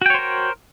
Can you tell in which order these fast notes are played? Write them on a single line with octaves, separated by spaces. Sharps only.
F#4 G5 C#5 C5 A#4